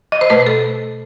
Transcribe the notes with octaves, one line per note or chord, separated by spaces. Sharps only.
D#5
C5
B2 A3 B4
A4